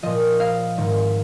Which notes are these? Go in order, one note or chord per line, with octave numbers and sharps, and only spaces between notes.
A#2 F3 D#5
F5
G#2 D#3